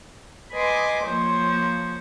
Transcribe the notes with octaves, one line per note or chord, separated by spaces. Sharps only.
B4 D#5 G#5 C6 D6
F3 A#3 C5 C#5